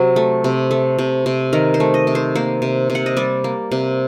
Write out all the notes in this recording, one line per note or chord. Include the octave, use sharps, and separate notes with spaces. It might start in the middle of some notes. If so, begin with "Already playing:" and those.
Already playing: C3 F#3 C4
A3
C3
A3
C3
C3
D#3 A#4
C5
A3
D#5
C3
C5
A#3 C5
C3
C3
F#5
D#5
G3 D5
A#3
C3